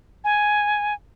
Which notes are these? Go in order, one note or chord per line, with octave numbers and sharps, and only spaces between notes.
G#5